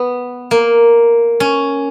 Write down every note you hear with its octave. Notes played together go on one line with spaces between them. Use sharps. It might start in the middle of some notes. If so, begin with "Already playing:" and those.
Already playing: B3
A#3
C#4